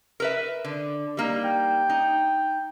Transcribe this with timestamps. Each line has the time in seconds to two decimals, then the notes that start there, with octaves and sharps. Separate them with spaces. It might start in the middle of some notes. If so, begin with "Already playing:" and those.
0.20 A#4 B4 E5
0.65 D3
1.17 G3 A#3 D#4
1.44 G5
1.90 D#4